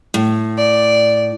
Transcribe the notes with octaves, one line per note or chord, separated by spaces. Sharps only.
A2
D5